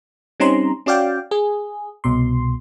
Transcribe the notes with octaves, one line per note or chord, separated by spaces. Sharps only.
G3 C4 C#4 D#4 A#5 C6
C#4 F#4 D5 F5 G5
G#4
C2 B2 C6